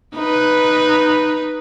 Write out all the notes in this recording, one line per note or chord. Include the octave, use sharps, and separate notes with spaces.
D#4 B4